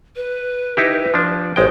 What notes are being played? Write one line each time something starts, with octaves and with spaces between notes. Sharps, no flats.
B4
D#4 E4 G4
F3 D4
A1 G#3 C5 G5